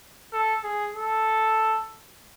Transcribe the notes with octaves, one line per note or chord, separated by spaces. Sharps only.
A4
G#4
A4